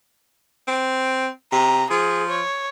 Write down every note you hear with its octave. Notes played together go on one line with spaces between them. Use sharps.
C4
C3 A#5
F3 G#4
C#5